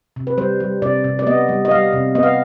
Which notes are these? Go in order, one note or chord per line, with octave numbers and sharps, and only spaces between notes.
C3
B4
G3 C5
G3
C3 D5
C3
D5
B3 D#5
G3
D#5
G3 F5
C3
B3 D#5
F5